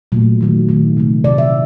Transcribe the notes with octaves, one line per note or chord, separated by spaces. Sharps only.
A#2 F#3 A3
D#3 F#3 A3
D#3 F#3 A3
C3 F3 A3
C3 F3 A3 D5
E5